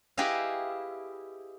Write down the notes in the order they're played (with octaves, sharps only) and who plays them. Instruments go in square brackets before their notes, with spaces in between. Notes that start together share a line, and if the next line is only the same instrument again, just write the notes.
[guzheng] E4 G4 G#4 B4 D#5 F5